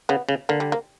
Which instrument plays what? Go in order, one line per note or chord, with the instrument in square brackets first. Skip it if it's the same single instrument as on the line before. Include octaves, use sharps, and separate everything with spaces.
[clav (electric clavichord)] C#3 [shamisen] B3
[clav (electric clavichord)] C#3
[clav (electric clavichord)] D3 [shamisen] A#3
[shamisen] G3
A#3